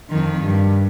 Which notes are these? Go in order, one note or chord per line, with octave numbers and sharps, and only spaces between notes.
F2 D#3
G2